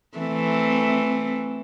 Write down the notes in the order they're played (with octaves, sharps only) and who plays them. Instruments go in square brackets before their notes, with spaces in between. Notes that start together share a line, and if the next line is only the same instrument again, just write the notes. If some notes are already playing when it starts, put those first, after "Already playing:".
[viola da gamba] E3 A3 C4